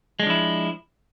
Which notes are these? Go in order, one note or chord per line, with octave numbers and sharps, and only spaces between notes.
F3 G#3 D4 E4